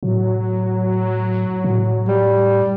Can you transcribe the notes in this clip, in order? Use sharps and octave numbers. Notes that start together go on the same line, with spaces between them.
A2 F#3
A2
G3